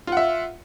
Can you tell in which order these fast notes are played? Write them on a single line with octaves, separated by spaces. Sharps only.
F4 F#5 E5